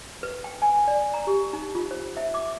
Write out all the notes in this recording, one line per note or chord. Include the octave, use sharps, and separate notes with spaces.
B4
G5
G#5
D5
A#5
G4
D#4
F4
C5
E5
D6